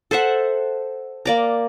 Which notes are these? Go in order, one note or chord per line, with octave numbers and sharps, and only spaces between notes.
A4 C5 E5 F#5
A#3 D5 A#5